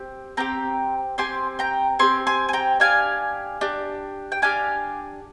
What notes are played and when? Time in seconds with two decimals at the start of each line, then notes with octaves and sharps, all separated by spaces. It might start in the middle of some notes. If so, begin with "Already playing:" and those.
Already playing: C4 G4
0.37 C4 G4 G5 A#5
1.18 C4 G4 G#5 C6
1.59 G5 A#5
1.99 C4 G4 G#5 C6
2.27 G#5 C6
2.49 G#5
2.53 G5 A#5
2.80 D4 G4 F5 G#5
3.61 D4 G4
4.32 G5
4.42 D4 G4 F5 G#5